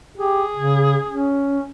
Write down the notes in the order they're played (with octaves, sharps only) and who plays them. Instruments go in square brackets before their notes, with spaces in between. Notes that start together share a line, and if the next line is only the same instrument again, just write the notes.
[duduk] G4 [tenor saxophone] G#4
[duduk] C#3
C#4